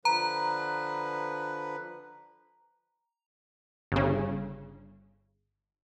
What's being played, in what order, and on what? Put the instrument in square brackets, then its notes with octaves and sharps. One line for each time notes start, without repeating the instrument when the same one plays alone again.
[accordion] D3 F3 B4 [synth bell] A#5
[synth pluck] G1 C#3